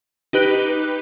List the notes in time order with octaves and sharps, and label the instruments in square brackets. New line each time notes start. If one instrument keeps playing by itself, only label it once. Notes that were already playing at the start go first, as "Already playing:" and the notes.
[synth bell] D#4 G4 B4 F#6